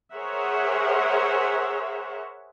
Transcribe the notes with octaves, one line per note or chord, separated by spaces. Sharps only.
G#4 A#4 C5 C#5 E5 F#5